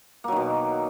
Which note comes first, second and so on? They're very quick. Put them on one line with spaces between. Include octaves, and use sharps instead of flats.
A#3 F#3 D#3 B2